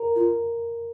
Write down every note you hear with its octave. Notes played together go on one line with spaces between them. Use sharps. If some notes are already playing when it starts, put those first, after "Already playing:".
Already playing: A#4
F4